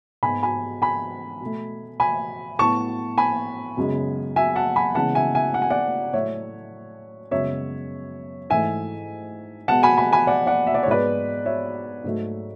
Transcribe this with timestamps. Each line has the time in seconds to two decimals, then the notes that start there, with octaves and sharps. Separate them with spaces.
0.23 G#2 G#3 B3 G#5 B5
0.43 G#5 B5
0.82 G#5 B5
1.41 B2 A3
2.00 G#5 B5
2.59 A2 F#3 B3 A5 C#6
3.18 G#5 B5
3.77 F#2 C#3 G#3 B3
4.36 E5 G#5
4.56 F#5 A5
4.76 G#5 B5
4.95 C#3 E3 G#3 B3 F#5 A5
5.15 E5 G#5
5.35 E5 G#5
5.54 F#5
5.62 G#5
5.70 D5 F#5
6.13 A2 F#3 A3 C#5 E5
7.31 F#2 C#3 G#3 B3 C#5 E5
8.50 G#2 E3 A3 E5 G#5
9.68 B2 G#3 B3 F#5 A5
9.83 G#5 B5
9.97 G#5 B5
10.13 G#5 B5
10.27 D5 F#5
10.47 D5 F#5
10.67 E5
10.75 D5
10.83 C#5
10.86 G#2 G#3 B3 B4 D5
11.45 C#5 E5
12.04 G#2 F#3 A3